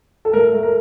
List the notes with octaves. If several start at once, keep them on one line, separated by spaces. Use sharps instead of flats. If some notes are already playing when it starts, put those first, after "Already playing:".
A4
A2 A#4
A3
A#4